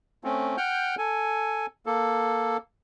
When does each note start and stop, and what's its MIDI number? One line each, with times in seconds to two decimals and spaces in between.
0.24 0.56 57
0.24 0.56 60
0.24 0.56 61
0.57 0.95 78
0.57 0.95 79
0.57 0.95 89
0.57 0.95 91
0.98 1.66 69
0.98 1.66 80
1.86 2.57 58
1.86 2.57 69